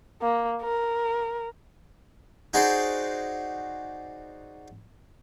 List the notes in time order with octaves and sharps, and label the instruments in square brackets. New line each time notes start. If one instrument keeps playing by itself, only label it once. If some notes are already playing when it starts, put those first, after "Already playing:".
[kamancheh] A#3
A#4
[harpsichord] D#4 F#4 G#4 C5 D5